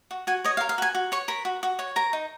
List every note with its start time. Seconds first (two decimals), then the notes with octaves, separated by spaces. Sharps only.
0.11 F#4
0.27 F#4 G#5
0.44 C#5 D#5
0.57 F5
0.61 A#4
0.69 F5
0.78 F#4 G#5
0.95 F#4
1.12 C#5 C#6
1.28 A#4 B5
1.45 F#4
1.63 F#4
1.79 C#5
1.96 A#4 A#5
2.13 D#4